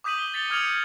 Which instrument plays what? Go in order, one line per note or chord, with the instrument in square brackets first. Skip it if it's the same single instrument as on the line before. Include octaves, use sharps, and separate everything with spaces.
[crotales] D6 D#6 G6 B6 D#7 F#7
G7
G6 A6 B6 C#7 F7 G7
D#6 F6 G#6 C#7 F7 F#7
G6